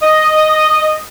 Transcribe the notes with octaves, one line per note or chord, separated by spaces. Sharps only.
D#5